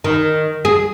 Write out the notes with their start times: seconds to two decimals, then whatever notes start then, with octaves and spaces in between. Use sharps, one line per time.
0.04 D#3
0.65 G#4